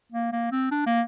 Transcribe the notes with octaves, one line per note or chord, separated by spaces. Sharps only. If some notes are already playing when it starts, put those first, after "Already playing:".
A#3
A#3
C4
D4
A#3